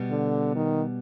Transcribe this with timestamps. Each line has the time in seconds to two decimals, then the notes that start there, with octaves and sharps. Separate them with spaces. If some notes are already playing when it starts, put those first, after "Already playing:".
Already playing: B2 G3 B3
0.11 D3
0.56 D#3